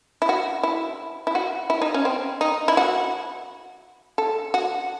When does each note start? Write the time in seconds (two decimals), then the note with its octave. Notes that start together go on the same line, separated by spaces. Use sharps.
0.22 E4
0.29 F#4
0.63 E4
1.27 E4
1.35 F#4
1.70 E4
1.82 D#4
1.94 C#4
2.05 C4
2.41 D#4
2.68 E4
2.77 F#4
4.18 A4
4.54 F#4